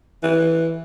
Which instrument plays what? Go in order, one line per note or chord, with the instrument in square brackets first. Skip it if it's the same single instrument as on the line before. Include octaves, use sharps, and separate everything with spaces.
[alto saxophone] E3